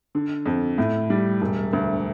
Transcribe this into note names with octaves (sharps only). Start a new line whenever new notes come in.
D3
F2
A2
G3
E1
D2